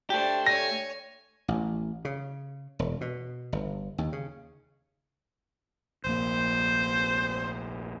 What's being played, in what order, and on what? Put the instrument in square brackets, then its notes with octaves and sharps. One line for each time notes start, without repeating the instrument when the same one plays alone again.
[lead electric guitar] A3 G4 [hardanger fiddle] D4 C5
[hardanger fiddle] C#5 G#5 [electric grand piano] A#6
[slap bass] A1
C#3
E1
B2
G1
D#2
C#3
[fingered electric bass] F1 A#1 A#3 [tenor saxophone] C5